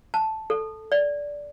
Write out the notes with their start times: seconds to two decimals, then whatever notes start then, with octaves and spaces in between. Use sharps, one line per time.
0.14 A5
0.50 A4
0.92 D5